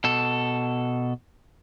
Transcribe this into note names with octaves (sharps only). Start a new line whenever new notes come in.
B2 A4